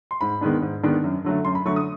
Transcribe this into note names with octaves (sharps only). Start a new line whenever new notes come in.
C6
G#2 B5
D#3 G#3 B3 D4
G#2
D#3 G#3 B3 D4
F#2
D3 F#3 A3
F#2 C6
B5
D3 F#3 A3 C#6
D#6